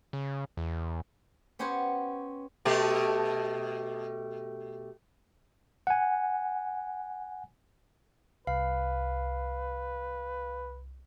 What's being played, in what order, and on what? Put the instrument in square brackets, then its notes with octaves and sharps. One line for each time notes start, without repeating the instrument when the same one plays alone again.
[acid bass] C#3
E2
[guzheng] B3 C#4 G4 C5 C#5 F#5
[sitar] B2 A3 G4
[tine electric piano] F#5 G#5
[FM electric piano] C2 [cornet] B4 [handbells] F5